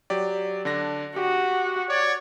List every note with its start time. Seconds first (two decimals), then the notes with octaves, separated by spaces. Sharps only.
0.10 F#3 G4 D5
0.65 D3 D4 A#6
1.16 F#4 G4
1.88 C#5 D5